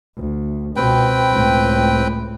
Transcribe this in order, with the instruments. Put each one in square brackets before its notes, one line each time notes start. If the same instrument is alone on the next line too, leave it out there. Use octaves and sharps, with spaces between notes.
[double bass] D2
[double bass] C#2 B2 [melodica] C4 B4 G5
[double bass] C#2 A2